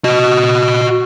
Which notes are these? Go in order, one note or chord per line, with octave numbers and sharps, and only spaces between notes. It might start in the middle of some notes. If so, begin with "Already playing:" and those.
F#4 D#5